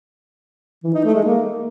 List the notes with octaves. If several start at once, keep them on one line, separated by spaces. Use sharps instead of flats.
E3
D#4
A3
G#3
A#3